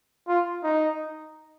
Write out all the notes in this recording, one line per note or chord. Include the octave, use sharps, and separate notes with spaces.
F4
D#4